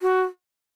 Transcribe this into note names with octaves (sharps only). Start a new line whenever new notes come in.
F#4